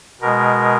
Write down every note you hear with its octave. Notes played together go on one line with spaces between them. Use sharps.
B2 G#3 A#4